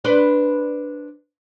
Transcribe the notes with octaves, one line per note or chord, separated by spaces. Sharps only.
D4 B4 C5